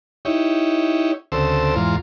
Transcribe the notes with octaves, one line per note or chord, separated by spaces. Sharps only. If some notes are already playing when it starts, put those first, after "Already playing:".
D#4 E4 G4 C#5
D2 C#3 C4 A4 C5 E6
E2 G#2 F4 A#5 C6